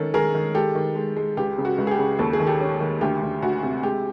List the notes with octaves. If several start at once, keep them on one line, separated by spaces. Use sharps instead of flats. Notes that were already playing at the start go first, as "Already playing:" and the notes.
Already playing: D#3 C#4 A4
D#3 G#4 A#4
D#3
G#3 G4 A4
D#3
G#3
G#3
C#2 G4
C#3
F#4
C#2
G#4
G4
C#3
D#2 A4
G#4
D#3
G4 A4
C#4
D#3
D2 G4
D2
D2 F#4
C3
G#3 G4